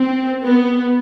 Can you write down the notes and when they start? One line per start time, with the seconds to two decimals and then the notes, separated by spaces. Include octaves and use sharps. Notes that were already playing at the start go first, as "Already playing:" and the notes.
Already playing: C4
0.44 B3